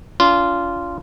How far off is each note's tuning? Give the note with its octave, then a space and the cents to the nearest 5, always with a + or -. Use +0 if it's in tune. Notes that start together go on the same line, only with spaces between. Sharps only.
D4 -40 F4 -10